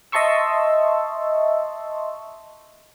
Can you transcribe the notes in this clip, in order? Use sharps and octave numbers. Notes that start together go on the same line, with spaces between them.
D#5 E5 A5 C6 C#6 E6